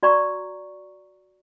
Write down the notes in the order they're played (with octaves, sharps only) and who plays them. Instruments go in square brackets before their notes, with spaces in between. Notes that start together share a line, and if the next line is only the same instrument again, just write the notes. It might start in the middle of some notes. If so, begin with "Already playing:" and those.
[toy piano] F#4 D5 A#5 C#6